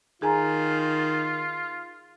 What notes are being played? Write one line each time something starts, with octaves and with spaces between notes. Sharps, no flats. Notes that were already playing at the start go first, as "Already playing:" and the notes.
D#3 F4 G#4 G#5 A#5